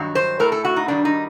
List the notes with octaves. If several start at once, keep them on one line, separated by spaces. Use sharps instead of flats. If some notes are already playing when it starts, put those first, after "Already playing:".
Already playing: G2 D#3 F#3
C5
A2 A3 A#4
A4
F#4
D#4
G2 D#3 G3 D4
D#4